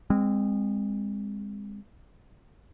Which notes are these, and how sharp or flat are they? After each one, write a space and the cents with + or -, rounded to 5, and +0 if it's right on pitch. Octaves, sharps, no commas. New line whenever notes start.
G#3 -30 C4 +0